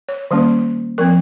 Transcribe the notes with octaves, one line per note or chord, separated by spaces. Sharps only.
C#5
D#3 G3 A#3 C#4
F3 C4 A#4